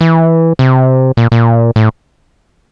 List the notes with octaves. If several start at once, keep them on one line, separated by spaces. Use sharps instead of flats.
E3
C3
A#2
A#2
A2